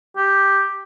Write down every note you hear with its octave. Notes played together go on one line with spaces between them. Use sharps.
G4